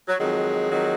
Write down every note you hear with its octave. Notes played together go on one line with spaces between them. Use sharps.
F#3
F2 D#3 F#3 G#3
F2 D#3 F#3